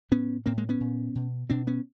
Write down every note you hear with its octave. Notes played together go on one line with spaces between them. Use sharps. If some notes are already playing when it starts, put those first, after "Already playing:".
A2 B3 C#4
A2 A#3 C4
G#3 A#3
B3 C#4
A#2
B2
B2 C4 D4
B3 C#4